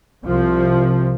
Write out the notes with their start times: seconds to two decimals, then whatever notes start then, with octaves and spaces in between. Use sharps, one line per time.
0.24 C2 C3 F3